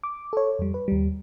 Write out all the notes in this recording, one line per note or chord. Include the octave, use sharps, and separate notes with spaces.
D6
A4 C#5
F2 G3
B4
D#2 G3